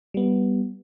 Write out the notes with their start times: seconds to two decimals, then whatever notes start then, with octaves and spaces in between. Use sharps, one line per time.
0.14 G3 B3